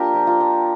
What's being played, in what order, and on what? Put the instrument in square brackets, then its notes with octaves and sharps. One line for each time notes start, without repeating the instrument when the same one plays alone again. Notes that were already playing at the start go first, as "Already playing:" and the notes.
Already playing: [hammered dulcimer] A#3 D4 F4 G4 A#4
F3
F4
F3